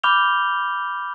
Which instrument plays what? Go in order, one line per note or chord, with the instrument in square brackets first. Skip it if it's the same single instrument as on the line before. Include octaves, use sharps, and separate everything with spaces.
[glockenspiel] B5 D6 F6 G6 F7 G7